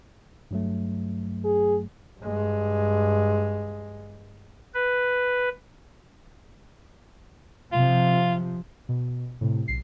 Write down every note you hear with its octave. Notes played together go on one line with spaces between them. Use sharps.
G2 F#3 A3
G#4
G2 G#3
B4
C3 F3 F4
B2
A2 C3
B1 C7